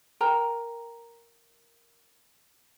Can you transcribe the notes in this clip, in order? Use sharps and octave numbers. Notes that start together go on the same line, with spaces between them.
A#4 G5 A#5